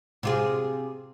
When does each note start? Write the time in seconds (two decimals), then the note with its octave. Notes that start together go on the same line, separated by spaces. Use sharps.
0.23 C3 F4 G#4